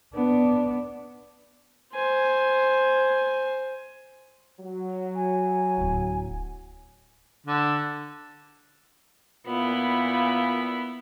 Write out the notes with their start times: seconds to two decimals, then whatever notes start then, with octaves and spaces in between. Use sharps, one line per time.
0.14 B3 D4
1.94 C5 G#5
4.61 F#3
5.15 G#5
5.77 D1 E4
7.47 D3
9.47 A#2 B3 E4